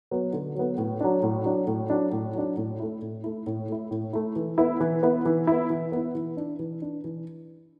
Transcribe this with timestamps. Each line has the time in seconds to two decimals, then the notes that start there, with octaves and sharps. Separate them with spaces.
0.11 F#3 B3
0.33 D3
0.55 F#3 B3
0.78 A2
1.00 F#3 D4
1.23 A2
1.45 F#3 D4
1.67 A2
1.90 F#3 D4
2.12 A2
2.35 F#3 D4
2.57 A2
2.80 A3 E4
3.02 A2
3.24 A3 E4
3.46 A2
3.69 A3 E4
3.91 A2
4.13 A3 E4
4.36 E3
4.58 B3 E4
4.80 E3
5.03 B3 E4
5.25 E3
5.47 B3 E4
5.70 E3
5.92 B3 E4
6.15 E3
6.37 D4
6.59 E3
6.82 D4
7.04 E3